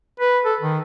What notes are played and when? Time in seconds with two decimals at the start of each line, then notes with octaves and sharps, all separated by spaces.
0.20 B4
0.46 A4
0.61 D#3